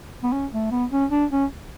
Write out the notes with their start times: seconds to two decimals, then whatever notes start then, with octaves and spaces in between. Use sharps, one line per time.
0.23 B3
0.32 C#4
0.52 A3
0.71 B3
0.91 C#4
1.11 D4
1.31 C#4